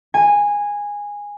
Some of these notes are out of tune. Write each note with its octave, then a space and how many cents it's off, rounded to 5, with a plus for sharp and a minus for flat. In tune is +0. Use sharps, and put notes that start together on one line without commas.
G#5 -15